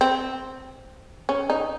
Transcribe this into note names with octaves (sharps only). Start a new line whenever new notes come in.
C4
C#4
D#4